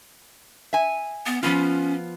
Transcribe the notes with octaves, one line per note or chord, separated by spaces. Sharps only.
E5 G#5
B3
F3 B3 C#4 F4